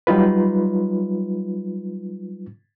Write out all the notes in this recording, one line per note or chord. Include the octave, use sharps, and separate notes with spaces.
F#3 G3 D#4 F4 B4